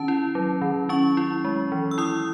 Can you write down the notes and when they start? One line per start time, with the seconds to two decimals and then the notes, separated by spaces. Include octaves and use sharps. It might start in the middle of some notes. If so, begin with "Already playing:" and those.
Already playing: D#3 C#4 A5
0.08 E4
0.35 F#3
0.62 D#3
0.89 C#4 C#6
1.17 E4
1.44 G#3
1.72 E3
1.91 E6
1.98 E4 D#6